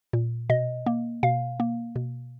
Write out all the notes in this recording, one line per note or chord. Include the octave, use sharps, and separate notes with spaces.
A#2
B2 D#5
A#3
B2 F5
A#3
B2